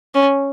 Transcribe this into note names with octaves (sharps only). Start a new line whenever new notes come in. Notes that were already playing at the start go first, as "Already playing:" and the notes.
C#4